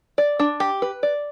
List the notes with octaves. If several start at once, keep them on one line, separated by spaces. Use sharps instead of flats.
D5
D4
G4
B4
D5